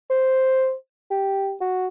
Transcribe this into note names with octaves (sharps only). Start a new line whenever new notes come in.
C5
G4
F#4